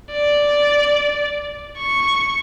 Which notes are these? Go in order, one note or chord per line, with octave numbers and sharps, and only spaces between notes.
D5
C#6